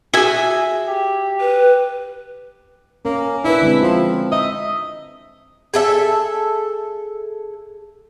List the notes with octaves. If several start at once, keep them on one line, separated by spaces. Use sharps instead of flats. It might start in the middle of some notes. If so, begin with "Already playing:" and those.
F#4 G#4 E5 G#5
G4
B4
A#3 C#4
D4 E4 B4
D3 G#3 C4
F3 F4
D#5 E5
G#4 A4 E5